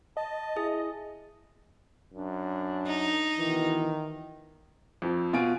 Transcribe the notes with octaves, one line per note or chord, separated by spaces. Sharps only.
D#5 A5
E4 G#4
F#2 D4
D#4
B2 D#3 E3
F2 F3
B2 F4 G#5 D7